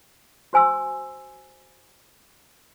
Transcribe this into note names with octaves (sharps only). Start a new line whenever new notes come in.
F#4 C5 G#5 C6 E6